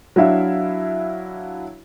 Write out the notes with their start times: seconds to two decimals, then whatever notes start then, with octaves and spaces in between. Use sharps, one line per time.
0.16 F#3 D4 E4 E5 F5